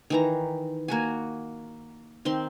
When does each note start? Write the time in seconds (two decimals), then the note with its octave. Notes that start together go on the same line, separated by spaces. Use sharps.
0.10 D#3 E3 A#5
0.88 A#3 F#4 G#5
2.25 D#3 C4 C6